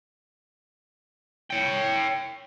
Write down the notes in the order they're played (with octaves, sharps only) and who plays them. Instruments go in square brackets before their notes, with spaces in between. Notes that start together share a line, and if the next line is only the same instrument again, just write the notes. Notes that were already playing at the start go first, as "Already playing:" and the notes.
[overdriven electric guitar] C#5 G5